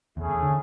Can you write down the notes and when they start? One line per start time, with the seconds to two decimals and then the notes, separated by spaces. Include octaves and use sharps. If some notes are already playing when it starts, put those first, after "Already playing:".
0.17 E2 A3 C#4 E4 G#4 C#5
0.30 E2
0.42 D3